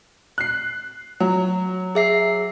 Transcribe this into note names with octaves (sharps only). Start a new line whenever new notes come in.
F#6 C7
F#3
G#4 E5 C7